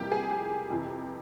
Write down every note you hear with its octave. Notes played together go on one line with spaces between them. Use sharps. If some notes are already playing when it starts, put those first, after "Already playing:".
Already playing: F2 C3 E3 G3 A#3 G4
G#4
G4
F2 C3 E3